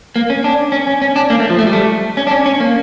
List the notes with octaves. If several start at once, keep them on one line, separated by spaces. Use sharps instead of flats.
A#3
C#4
D4
C#4
C#4
C#4
D4
A#3
A3
F3
A3
G3
A3
C#4
D4
C#4
C#4
A#3